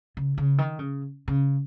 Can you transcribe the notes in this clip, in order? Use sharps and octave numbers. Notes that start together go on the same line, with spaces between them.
C#3
C#3
D#3
C#3
C#3